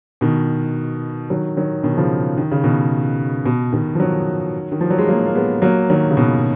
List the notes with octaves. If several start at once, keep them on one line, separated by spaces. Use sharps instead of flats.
B2 D#3
D#3 F#3
D#3 F#3
B2 D#3
C#3 F3
D#3
C#3
B2 D#3
B2
B2 D#3
F3
D#3 F#3
D#3
F3
F#3
G#3
F#3 A#3
A#3
G#3 B3
F#3 A#3
D#3 F#3
C#3
B2 D#3